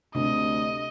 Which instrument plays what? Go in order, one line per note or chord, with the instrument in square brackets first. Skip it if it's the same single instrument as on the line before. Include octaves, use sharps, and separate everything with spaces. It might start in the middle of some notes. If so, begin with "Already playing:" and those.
[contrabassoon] D2 [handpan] C3 [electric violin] D#5